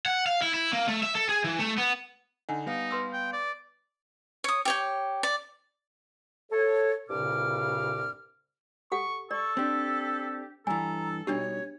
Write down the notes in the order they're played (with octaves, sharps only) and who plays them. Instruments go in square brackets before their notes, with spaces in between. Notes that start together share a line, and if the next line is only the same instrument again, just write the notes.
[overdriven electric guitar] F#5
F5
E4
E4
A#3
A3
E5
A4
G#4
E3
A3
B3
[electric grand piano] D3 D#4 [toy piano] F#5 G#5
[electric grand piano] G3 B3 F5 [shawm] D#4
[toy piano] B4 C6 E6
[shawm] G5
D5
[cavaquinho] C#5 D#6
G4 C#5 G5
D5
[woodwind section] A4 C#5
C2 G2 A#2 C#3 D6 F6
[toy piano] G4 A4 F#5 [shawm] C#6
[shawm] A4 [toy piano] D5 [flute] C#6
[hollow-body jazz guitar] C4 D4 [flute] G4
[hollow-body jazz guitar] G2 E3 [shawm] A4 [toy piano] G#5 [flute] A#5
[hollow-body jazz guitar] B2 G3 D#4 [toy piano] D4 G4 [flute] C#5